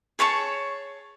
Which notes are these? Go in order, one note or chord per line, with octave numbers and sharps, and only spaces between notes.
G#4 C#5 A5 C#6